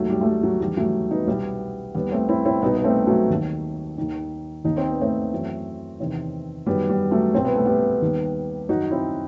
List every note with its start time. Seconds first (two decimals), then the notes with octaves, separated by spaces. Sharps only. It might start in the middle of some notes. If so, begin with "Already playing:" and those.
Already playing: D#2 D#3 F#3 A3
0.09 G3
0.21 A3
0.26 G3
0.43 F#3
0.60 E2 D#3 G3
0.77 F#3 A3
1.11 B3 D#4
1.27 C2 B2 G3 B3
1.95 D#2 D#3 G3 B3
2.12 A3 C4
2.29 C4 E4
2.45 C4 E4
2.62 C2 B2 B3 D#4
2.76 B3
2.84 A3 C4
3.07 F#3 A3
3.30 D#2 D#3
3.97 D#2 D#3
4.64 D#2 D#3 D#4
4.77 C4
4.89 B3
5.01 A3 C4
5.32 F#2 E3
6.00 E2 C3 D#3
6.66 F#2 D#3 G3 B3
6.89 G3
7.11 F#3 A3
7.34 C2 B2 C4
7.45 B3
7.56 A3
7.66 G3 B3
8.02 D#2 D#3
8.69 F#2 D#3 D#4 F#4
8.91 C4 E4